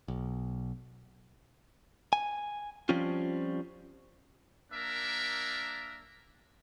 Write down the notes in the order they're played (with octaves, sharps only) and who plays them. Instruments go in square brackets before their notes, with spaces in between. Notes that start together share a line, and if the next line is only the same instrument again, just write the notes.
[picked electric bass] B1
[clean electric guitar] G#5
F3 G3 C4 C#4 F4
[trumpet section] A#3 D4 A#4 E5